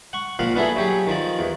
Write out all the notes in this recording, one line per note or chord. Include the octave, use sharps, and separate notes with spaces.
F#5 C#6
A#2 F3 F5 F#5
B3 D4 E4 G#4 A4
F#3 G4 G#4
D#3 F3 D5
E2